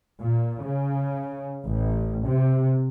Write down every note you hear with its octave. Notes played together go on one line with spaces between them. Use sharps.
A#2
C#3
A1
C3